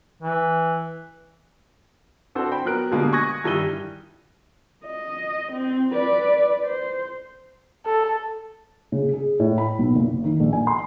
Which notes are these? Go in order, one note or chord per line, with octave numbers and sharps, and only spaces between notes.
E3
C4 D4 E4 F#4 A4 C5
C5 G5 B5
F#3 B3 A#4 F#6 D7
B2 D3 G3 G#3 A#3 B3
G#5 C#6 D#6 F#6 G#6 A#6
G2 D#3 G3 E4 D#7 G7
D#5
C4
B4 D5
C5
A4
C#3
G#4
A2
B5
B1
F#1
D#3
A#1
G#5
C6